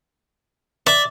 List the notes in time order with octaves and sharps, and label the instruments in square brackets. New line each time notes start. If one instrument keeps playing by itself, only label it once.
[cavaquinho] D5 [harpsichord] E5